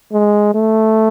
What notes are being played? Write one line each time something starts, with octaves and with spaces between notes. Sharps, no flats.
G#3
A3